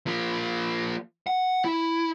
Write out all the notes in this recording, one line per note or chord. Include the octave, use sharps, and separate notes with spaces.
F3 A#3
F#5
E4